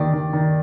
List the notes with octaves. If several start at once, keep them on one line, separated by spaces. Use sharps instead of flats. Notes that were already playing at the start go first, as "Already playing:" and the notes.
Already playing: D#2 D#3 D5
D#3
D#3